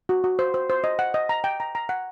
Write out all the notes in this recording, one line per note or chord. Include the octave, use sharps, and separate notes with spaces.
F#4
F#4
C5
C5
C5
D#5
F#5
D#5
A#5
G5
A#5
A#5
F#5